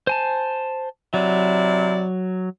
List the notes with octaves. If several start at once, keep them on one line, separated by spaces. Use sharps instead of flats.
C5 G#5 A5
C3 F#3 E4 D5